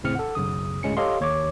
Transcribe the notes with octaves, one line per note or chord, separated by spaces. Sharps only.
D#2 A2 C#3 C4 F6 C#7
A4 F#5
B1 F#2 C#3 D#6
D2 A2 G#3 C#4 C#7
G4 A4 C#5 D#5 F5 C6
D#2 C#5 D6